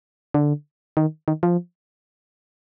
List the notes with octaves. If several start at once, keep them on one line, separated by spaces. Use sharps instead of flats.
D3
D#3
D#3
F3